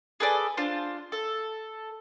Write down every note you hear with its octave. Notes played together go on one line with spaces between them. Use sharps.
G#4 A4 B4 D5
D4 F4 C5
A4